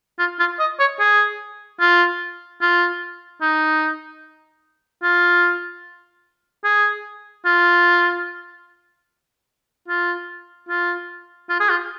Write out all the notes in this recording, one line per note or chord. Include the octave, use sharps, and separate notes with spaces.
F4
F4
D#5
C#5
G#4
F4
F4
D#4
F4
G#4
F4
F4
F4
F4
G#4
F4